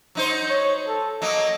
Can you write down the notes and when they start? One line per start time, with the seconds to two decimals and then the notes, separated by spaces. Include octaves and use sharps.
0.15 F#3 D#4 C5
0.50 C#5
0.88 A4
1.22 F#3 A#3 D#5